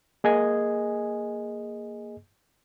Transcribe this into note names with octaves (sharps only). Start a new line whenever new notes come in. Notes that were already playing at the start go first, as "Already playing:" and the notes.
A#3 G#4 D#5 G#5